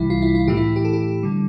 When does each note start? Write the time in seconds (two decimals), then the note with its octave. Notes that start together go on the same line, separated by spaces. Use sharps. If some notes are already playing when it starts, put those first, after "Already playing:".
Already playing: C2 C3 E3 G3 E4
0.10 F4
0.22 E4
0.35 F4
0.48 A2 E3 A3 G4
0.57 E4
0.76 G4
0.85 A4
0.93 G4
1.23 D3 G3